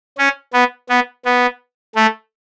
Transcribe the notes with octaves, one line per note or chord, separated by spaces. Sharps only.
C#4
B3
B3
B3
A3